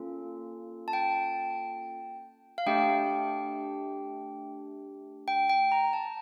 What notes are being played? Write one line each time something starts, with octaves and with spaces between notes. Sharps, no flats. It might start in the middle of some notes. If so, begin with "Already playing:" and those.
Already playing: A#3 C#4 F4 A4
A5
G5
F5
A3 D4 G4 G5
G5
G5
A#5
A5